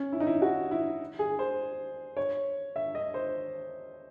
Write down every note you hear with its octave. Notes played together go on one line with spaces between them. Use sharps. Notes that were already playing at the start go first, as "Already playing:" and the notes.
Already playing: C#4
E4
D#4
E4
F#4
E4
G#4
C5
C#5
E5
D#5
C5